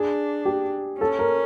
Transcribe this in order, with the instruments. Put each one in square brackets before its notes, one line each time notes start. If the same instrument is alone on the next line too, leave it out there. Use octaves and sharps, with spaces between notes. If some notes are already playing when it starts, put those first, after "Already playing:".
Already playing: [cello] D4 [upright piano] G#4
[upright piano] G4
[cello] C#4 [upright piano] A4
[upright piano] A#4